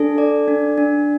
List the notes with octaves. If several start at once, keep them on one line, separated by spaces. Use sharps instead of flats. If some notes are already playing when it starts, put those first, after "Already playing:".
Already playing: D4 A4
D5
D4
D4